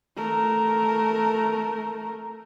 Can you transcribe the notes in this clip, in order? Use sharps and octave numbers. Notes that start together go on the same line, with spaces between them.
A3 A#4